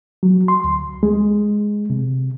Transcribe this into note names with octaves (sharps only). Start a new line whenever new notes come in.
F#3
C6
D2
G#3
C3